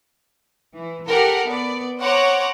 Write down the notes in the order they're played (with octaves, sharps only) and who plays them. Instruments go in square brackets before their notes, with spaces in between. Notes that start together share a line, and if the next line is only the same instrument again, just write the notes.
[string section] E3
G4 A4 A#4 F#5
B3 D5
C5 C#5 F#5 A#5 D6